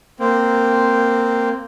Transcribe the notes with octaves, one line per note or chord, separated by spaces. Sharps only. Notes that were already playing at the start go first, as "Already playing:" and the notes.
A#3 C4